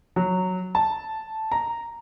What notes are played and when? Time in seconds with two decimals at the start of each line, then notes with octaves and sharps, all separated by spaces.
0.16 F#3
0.75 A5
1.52 A#5